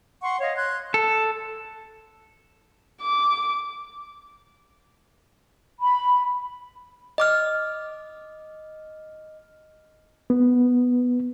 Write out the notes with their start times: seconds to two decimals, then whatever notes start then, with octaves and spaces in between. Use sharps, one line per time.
0.23 F#5 C6 C#6
0.41 C#5 D#5 F5
0.56 C6 F#6 G#6
0.94 A4
3.02 D6
5.81 B5
7.18 D#5 D6 F6
10.30 B3